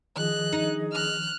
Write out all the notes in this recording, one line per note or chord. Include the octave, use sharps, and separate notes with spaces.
D#3 F3 G#4 D#5 F#6
D#4
F6 F#6